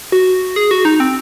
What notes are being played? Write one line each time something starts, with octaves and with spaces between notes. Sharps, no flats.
F#4
G#4
F#4
D#4
C4